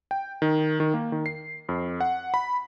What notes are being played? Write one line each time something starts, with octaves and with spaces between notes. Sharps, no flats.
G5
D#3
D#3
A#3
D#3
C7
F2
F#5
B5